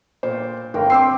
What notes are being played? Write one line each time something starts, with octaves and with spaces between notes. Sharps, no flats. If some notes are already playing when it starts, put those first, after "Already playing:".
A#2 C5 D6
G1 A#4 G5
C4 D6 E6 C7